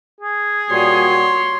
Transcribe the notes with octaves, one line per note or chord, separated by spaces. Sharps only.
G#4
A#2 G3 F#4 C#5 C6